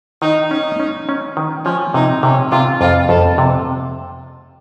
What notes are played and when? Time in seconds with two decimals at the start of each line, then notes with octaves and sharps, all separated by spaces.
0.22 D#3 D#4
0.50 C#4 D#4
0.80 C#4
1.09 C#4
1.37 D#3
1.65 F3 C#4
1.94 C3 D#4
2.22 C3 C#4
2.52 C3 F4
2.81 F2 F4
3.09 F2 A4
3.38 C3